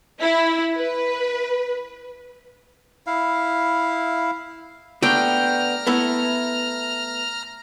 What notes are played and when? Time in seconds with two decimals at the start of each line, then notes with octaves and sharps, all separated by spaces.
0.20 E4
0.75 B4
3.07 E4 F5
5.02 A3 B3 D4 G5 A#5 F6
5.87 A3 B3 E4